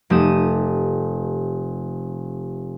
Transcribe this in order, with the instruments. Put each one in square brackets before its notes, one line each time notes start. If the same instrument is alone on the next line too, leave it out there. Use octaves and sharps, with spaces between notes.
[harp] F1 A3 G4 D#6 E7